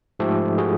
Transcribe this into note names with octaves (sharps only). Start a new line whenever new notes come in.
G#2 F3 A3 G4 A4
F#4 G#4